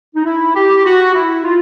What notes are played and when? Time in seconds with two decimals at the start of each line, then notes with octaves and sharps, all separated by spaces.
0.15 D#4
0.25 E4
0.55 G4
0.85 F#4
1.15 E4
1.45 F4